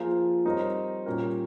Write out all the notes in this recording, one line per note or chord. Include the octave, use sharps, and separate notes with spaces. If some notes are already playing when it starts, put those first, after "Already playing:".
Already playing: F3 A#3 F4 G#4
G3 C4 D#4 A#4 C#5
A#2 G3 C#4 G4 A#4